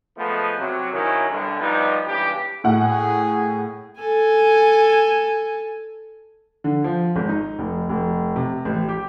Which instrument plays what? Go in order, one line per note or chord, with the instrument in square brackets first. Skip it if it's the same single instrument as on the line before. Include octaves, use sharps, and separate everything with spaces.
[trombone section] F3 G#3 A3 B3
C3 F#3
D#3 F#3 C#4 D#4 E4 A#4
B1 D3 G3
F3 G3 B3 D#4
C#2 G2 E3 B3 G4
[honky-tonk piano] A2 F#5 [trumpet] G#4
[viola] A4 G#5
[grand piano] D3
F3
G#1
D#4
F1
F1
C3
A1
G4